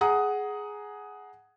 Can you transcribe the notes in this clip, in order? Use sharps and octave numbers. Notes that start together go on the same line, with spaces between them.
G#4 F#5 A#5 D#6